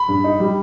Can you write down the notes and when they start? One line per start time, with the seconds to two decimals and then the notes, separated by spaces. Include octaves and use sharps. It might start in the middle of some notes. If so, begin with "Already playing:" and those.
Already playing: B5
0.08 G2
0.24 D#4
0.40 G3